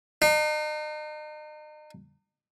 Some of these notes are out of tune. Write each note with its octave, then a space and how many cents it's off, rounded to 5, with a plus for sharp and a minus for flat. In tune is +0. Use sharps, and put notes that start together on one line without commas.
D#4 -40